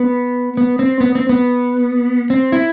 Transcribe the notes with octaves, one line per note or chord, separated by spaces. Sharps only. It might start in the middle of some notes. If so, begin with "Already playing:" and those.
Already playing: B3
B3
C4
B3
C4
B3
C4
E4